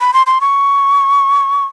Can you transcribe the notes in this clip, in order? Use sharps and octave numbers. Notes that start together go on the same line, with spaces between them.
B5
C6
C6
C#6